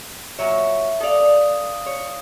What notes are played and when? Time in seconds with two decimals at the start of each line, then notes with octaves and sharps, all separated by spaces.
0.39 A#2 F#3 C#5 E5
1.00 A4 D5 F5 D#6
1.86 C#5